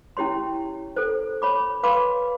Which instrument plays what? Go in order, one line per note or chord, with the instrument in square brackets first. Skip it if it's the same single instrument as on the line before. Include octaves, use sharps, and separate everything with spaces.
[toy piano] C#4 E4 G4 C#5 C6
A4 C5
C#5 B5 D6
B4 F5 B5 C6 D6